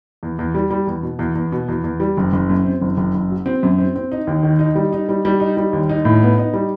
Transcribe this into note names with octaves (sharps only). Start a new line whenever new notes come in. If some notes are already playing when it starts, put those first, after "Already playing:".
E2
E2
G3
G3
E2
B2
E2
E2
B2
E2
E2
G3
F#1
F#1
F#2
C4
F#1
F#1
F#1
F#3
C4
F#2
C4
C4
D#4
D#2
D#3
D#4
G3
D#4
G3
G3
D#4
G3
D#2
D#4
A2
B3
D#4
G3